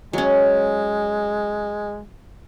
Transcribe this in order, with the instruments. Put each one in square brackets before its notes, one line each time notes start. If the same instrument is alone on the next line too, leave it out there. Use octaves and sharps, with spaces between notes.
[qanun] F#3 C#4 [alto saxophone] G#3